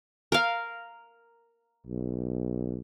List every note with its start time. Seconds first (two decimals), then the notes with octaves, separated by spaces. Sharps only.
0.32 A#4 F5
1.87 B1